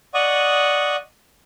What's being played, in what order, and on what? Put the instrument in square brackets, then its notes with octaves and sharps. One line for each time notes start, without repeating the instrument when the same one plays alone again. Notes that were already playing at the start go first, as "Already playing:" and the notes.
[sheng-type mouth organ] D5 D#5 F#5 C#6 D#6